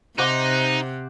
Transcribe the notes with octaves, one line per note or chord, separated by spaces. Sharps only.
C3 D#4 C5 F#5 D6